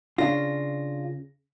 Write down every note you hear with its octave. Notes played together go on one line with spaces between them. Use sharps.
C#3 D4 F4 A#6